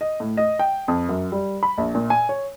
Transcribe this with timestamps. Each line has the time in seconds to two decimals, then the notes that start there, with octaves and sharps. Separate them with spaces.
0.01 D#5
0.20 A2
0.37 D#5
0.59 G5
0.88 F2
1.09 F#2
1.32 G3
1.63 B5
1.78 A#1
1.95 A#2
2.10 G#5
2.29 C#5